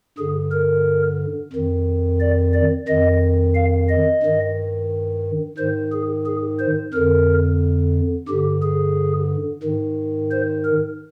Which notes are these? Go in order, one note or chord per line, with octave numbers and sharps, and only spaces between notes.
G2 D3 G#4
A#4
F2 D#3
D5
D5
F2 D#3 D#5
F5
D#5
G2 D#3
G#2 D#3 C5
G#4
G#4
C5
F2 D3 A#4
G2 D3 G4
G#4
G#2 D#3
C5
A#4